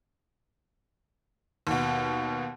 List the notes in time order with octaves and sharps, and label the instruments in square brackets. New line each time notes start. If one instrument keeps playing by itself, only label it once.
[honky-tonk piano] D#2 B2